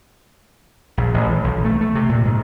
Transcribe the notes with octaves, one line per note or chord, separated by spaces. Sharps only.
A#1
A1
E3
B1
A3
A3
C3
A#2
G#2